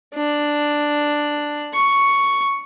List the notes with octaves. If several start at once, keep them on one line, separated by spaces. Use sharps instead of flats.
D4
C#6